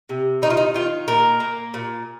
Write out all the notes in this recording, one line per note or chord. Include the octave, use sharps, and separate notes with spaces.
C3
D#3 D#4
F4
D#4
D#3 F4
A#2 A#4
A#3
A#2